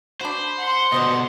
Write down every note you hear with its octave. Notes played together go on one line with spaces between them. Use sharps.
D4 F#4 C5 B5
F#5 C6
B2 D3 B4 C5 D#5